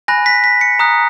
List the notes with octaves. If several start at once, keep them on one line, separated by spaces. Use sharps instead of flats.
G#5 B5 F#6 A#6
B6
B6
C#7
A#5 D#6 F#6